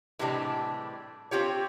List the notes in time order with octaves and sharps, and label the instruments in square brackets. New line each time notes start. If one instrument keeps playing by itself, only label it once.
[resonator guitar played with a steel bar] A2 C3 E3 G3 G#3 D4
C4 F4 G4 C#5